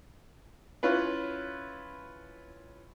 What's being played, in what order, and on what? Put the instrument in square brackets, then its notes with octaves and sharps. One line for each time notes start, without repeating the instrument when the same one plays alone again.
[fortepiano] C#4 E4 F4 B4